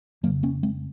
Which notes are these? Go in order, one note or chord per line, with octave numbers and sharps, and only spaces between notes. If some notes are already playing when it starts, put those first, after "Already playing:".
F2 C#3 F#3 A#3
A#3 C#4
G#3 C4